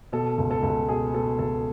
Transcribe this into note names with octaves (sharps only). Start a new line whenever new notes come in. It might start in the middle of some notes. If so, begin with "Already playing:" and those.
B2 A4
C#2
A4
C#2
A4
B2 G#4
B2 A4
C#2 A4